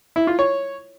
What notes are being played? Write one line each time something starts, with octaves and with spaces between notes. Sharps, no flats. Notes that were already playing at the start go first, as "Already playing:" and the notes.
E4
F4
C#5